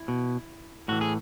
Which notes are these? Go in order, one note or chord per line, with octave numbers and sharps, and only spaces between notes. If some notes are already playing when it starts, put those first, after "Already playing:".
Already playing: E4
B2
A2 E3 F#4
G#4